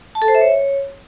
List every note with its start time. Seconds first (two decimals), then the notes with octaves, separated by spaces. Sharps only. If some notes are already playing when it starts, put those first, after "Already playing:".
0.15 A5
0.22 A4
0.28 C5
0.35 E5
0.41 C#5